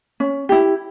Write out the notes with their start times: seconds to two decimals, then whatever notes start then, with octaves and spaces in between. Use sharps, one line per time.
0.20 C#4
0.49 E4 G4